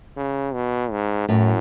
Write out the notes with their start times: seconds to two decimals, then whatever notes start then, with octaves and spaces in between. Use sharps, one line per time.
0.17 C#3
0.54 B2
0.91 G#2
1.29 F#2 A2